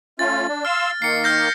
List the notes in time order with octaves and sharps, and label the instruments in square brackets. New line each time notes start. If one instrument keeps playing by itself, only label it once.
[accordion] A3 C#4 F4 [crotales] A6
[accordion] D4
[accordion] F5 C6 E6 [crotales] F6
[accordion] D#3 A#3 [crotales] C7 C#7
[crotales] F6 G6 A#6